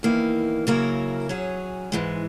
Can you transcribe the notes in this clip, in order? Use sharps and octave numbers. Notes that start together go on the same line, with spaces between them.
E2 D#3 A#3 E4
C#3 F#3 A#3 E4 A#4
F#3 C#4 G#4
G#2 E3 G#3